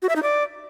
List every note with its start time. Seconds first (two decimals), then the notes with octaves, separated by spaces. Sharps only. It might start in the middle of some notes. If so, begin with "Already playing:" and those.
0.02 F#4
0.09 E5
0.16 D#4
0.23 D5